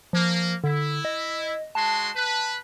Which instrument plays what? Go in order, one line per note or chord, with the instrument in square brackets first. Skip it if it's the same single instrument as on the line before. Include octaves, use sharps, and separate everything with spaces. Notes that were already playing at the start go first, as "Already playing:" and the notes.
[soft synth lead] F3 [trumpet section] A#3
[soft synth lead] D3 [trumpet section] E4
[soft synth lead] D#5
[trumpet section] G#3 F#4 C6 [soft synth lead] A5
[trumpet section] B4